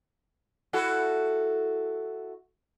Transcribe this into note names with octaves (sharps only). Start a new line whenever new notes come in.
E4 F#4 A4